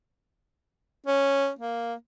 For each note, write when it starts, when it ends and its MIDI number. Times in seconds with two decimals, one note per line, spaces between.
1.07 1.50 61
1.59 1.94 58